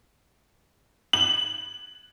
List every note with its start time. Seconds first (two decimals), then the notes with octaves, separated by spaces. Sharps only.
1.13 F#7